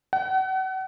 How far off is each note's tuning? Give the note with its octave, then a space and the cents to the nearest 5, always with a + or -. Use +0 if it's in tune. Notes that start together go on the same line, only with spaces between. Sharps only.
F#5 +40